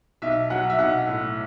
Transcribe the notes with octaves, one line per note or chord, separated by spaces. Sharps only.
B1 E5
F#3 F#5
E5
B1 F#5
A2